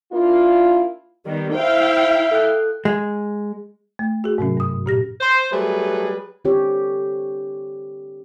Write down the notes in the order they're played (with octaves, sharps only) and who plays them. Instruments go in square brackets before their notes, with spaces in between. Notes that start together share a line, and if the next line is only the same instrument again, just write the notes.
[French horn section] A#3 D4 E4 F4
[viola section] D#3 G3 B3
[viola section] E4 F5 G5 [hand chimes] C5 [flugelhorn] E5
[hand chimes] A4 F#6
[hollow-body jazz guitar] G#3
[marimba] A3
F#4 G#4
G#2 C3 F#3 C#4
G2 D#6
A#2 G4 A#6
[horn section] C5
F#3 G3 A3 G#4 B4
[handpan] D3 C4 G4 C#5